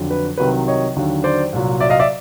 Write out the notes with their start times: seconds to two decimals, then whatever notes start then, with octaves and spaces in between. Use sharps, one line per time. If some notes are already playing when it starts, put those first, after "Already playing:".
Already playing: F2 D3 F#3
0.11 B4
0.38 C2 C3 D#3 F#3 B4
0.68 C#5 D#5
0.96 D#2 D3 F#3
1.24 C5 D5
1.52 C2 A#2 F#3
1.80 D5 E5
1.90 D#5 F5
1.99 D5 E5